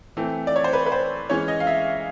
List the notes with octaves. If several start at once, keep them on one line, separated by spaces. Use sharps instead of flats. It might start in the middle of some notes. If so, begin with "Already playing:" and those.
E3 A3 C4
D5
C#5
C5
B4
B4
C5
E3 G#3 C#4 C#5
D#5
F5
E5